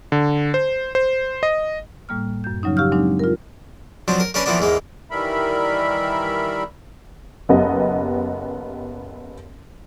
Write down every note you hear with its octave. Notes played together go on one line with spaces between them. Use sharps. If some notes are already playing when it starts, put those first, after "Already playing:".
D3
C5
C5
D#5
A2 G3 A#3 F6
F#2 G6
C#3 F3 F#3 C#4 D#4
G4 F5 C#6 E6 F6 G6
F#3 G#3 C4 D4 D#4
F4 A#4
F3 F#3 C4 D4
A#4
A#3 C#4 D4 A#4 B4
E3 F3 A#3 B3 D4
E2 G#2 G#3 A#3
D#3 E3 G3 A#4 E5 B5
F#1 B3 G4 D#5